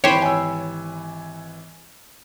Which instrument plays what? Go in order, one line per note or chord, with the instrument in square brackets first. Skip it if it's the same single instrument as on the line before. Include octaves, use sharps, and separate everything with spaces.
[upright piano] G#1 E3 [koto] G4 C5 [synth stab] C#5 B5
[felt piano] G#5 E6